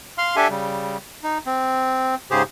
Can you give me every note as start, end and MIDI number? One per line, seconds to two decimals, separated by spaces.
0.18 0.36 77
0.18 0.36 84
0.18 0.36 89
0.36 0.48 62
0.36 0.48 67
0.36 0.48 69
0.36 0.48 76
0.36 0.48 80
0.49 0.97 49
0.49 0.97 55
1.23 1.38 63
1.46 2.15 60
2.31 2.43 44
2.31 2.43 49
2.31 2.43 67
2.31 2.43 68
2.31 2.43 72